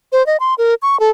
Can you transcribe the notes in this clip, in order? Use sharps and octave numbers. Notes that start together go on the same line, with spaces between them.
C5
D#5
C6
A#4
C#6
A4